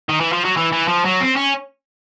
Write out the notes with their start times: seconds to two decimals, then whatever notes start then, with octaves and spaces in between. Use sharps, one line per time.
0.09 D#3
0.20 E3
0.33 F3
0.45 F#3
0.57 E3
0.72 E3
0.88 F3
1.05 F#3
1.20 C4
1.36 C#4